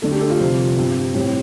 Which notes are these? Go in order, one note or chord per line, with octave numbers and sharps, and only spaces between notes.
D3 A3 D4 A4
G4
A4
F4
F2 C3 G3
G2 G3 C4
A2 G3 C4 G4